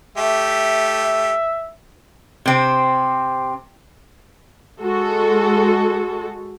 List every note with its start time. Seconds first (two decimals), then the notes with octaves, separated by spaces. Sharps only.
0.18 A3 G4 E5
2.46 C3 C4
4.82 G#3 F#4 A4